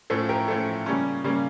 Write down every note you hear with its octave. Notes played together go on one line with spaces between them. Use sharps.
A2 F3 A3 C#4 A4
G4 A#4
A2 F3 A3 C#4 A4
C#3 G3 A#3 C#4
C#3 G3 A#3 C#4